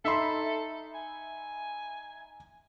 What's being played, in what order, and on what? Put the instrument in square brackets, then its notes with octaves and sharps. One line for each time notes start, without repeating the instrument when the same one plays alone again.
[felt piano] D#4 C6 [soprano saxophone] A4 [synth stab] E5 B5
[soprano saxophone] G#5